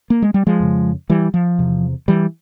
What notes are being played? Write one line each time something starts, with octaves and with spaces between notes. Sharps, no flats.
A#3
G#3
G3
F3 G#3
F2 C#3
E3 G3
F3
E2 C3
E3 G3